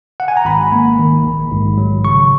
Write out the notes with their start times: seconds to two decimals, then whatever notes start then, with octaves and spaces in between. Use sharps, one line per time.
0.20 F#5
0.28 G#5
0.37 A#5
0.45 G#1 B5
0.72 A#3
0.99 D#3
1.24 A#1
1.52 G#2
1.78 F#3
2.05 C#3 C#6